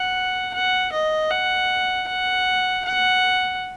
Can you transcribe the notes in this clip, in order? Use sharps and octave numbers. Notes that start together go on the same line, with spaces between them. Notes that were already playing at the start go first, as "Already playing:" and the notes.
Already playing: F#5
F#5
D#5
F#5
F#5
F#5